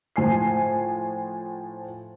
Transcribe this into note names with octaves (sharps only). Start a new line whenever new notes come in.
A2 F3 G#5 C7